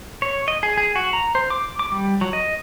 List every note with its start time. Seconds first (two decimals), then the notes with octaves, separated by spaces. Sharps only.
0.22 C#5
0.48 D#5
0.63 G#4
0.77 G#4
0.95 F#4
1.13 A#5
1.35 C5
1.50 D6
1.79 D6
1.92 G3
2.21 F#3
2.33 D#5